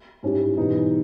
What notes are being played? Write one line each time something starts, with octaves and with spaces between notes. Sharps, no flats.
G#2 G3 C#4 E4 G4
E2 B2 G3 B3 D#4